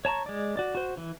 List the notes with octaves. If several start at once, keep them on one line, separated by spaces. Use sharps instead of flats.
C#5 A5 A#5 C#6
G#3 D5
F#4 D5
F#4 C5
E3